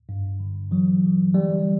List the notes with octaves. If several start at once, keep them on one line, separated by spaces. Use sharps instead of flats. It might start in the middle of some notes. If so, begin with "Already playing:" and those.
G2
D3
E3 F#3
E3
D3 G3